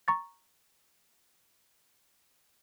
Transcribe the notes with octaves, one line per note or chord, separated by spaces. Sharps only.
A#5 C#6 A6